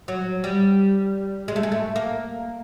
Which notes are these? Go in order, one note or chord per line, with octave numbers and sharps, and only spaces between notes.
F#3
G3
G#3
A3
G#3
A3
A#3